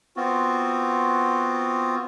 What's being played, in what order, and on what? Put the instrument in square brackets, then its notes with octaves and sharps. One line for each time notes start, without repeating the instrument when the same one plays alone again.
[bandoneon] B3 C4 F4 F#4